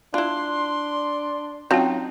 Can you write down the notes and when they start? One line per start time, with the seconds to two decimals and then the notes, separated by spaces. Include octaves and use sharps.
0.14 D4 E4 F4 C6
1.71 F#3 C4 C#4 D#4 F4 G5